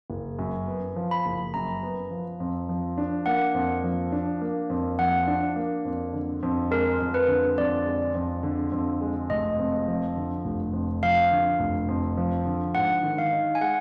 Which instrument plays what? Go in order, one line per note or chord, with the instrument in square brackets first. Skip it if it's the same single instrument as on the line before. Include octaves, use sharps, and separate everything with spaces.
[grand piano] F#1
F#2
B3
F3
[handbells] B5
[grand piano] F#1
[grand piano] F#2 [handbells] A#5
[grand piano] B3
F3
F2
F3
D4
[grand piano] A#3 [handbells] F#5
[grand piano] F2
F3
D4
A#3
F2
[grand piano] F3 [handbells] F#5
[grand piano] D4
A#3
F2
D3
F2
[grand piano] G#3 [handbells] A#4
[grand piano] F2
[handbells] B4
[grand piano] D3
[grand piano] F2 [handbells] D5
[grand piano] G#3
F2
D3
F2
G#3
[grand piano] F1 [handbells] D#5
[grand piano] F2
F3
D3
F1
F2
[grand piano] F3 [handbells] F5
[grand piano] D3
F1
F2
F3
D3
[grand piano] G#2 [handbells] F#5
[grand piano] D#3
[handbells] F5
[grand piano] D#4
[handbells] G#5
[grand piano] G#3 [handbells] F#5